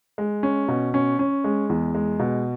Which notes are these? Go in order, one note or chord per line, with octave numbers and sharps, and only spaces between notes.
G#3
C#4
B2
C#4
C#4
G#3
E2
G#3
B2